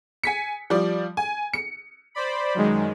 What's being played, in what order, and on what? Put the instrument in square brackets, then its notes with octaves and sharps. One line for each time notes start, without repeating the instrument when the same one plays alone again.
[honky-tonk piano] G#5 B6 C#7
F3 G3 D5
G#5
C#7
[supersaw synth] C5 D5 B5
F#2 D#3 G#3